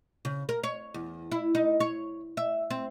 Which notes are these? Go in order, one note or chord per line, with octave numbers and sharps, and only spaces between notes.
C#3
A#4
C#5
E2
E4
D#4
C#5
E5
C4